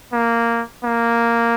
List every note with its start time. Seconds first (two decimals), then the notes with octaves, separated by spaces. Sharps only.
0.13 A#3
0.84 A#3